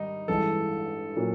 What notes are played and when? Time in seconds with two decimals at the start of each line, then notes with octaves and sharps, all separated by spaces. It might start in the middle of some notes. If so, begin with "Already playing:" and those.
Already playing: G#2 D#3 G3 D#4
0.28 A1 G2 E3 G#3 A4
1.16 A#2 F#3 A#3 C#4